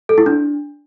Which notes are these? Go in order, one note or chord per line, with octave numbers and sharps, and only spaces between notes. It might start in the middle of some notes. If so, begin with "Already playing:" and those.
A4
E4
D4